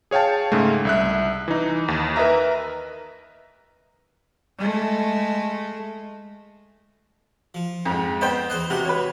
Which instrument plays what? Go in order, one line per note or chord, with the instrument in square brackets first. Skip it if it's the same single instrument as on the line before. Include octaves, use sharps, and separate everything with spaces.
[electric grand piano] G#4 C#5 F5 G5 A5
G#2 C#3 G#3 A3
C2 E5 F#6
E3 D#4
D#2
A#4 B4 D#5 E5 A#5
[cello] G#3 A3
[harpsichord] F3
[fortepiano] F2 G#2
[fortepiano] B3 C5 G5 [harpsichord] D#5
[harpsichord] E2 C5 D#5 [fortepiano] F#6
[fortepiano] C3 [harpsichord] F#4 C6
[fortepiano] B4 C#5